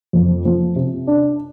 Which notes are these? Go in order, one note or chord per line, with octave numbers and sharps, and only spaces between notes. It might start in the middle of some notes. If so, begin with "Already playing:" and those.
F2
F3
C3
D4